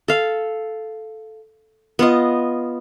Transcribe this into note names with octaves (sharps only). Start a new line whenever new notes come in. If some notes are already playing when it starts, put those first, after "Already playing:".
A4 F5
B3 F4 D#5